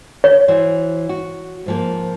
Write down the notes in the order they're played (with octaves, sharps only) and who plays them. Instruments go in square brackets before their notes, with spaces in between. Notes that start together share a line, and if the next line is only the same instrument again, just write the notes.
[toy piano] C#5
[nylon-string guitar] E3 F#4 C5
F#4
G#2 F3 A#3